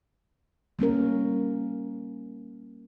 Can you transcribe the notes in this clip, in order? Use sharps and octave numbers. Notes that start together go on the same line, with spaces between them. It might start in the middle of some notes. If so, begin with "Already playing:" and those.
G3 A#3 C#4 A#4